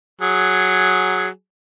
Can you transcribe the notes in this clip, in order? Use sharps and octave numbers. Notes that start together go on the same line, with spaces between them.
F#3 G#4